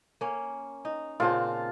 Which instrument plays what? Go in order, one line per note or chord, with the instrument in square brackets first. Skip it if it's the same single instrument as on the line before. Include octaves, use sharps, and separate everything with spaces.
[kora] A#3 C#4
D#4
[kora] A#2 C#3 C4 [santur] F4 A5